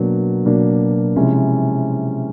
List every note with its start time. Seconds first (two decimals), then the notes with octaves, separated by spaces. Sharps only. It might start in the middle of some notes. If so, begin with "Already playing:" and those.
Already playing: B2 F#3 A#3 D4
0.45 B2 F#3 A#3 D4
1.16 C3 F3 G#3 C#4 E4